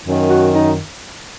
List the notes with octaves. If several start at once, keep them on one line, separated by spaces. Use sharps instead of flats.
F#2 D#3
F#4
D#4